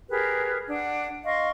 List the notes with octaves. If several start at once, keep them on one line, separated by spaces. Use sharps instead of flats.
G4 G#4 A#4 B4
D4 F#5
D#5 F5 C6 C#6